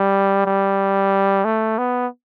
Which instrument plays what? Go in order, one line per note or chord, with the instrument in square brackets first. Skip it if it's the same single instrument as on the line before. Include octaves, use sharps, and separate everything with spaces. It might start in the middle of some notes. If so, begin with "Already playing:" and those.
Already playing: [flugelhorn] G3
G3
A3
B3